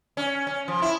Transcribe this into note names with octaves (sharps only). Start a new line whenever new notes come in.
C#4
C#4
F3
E4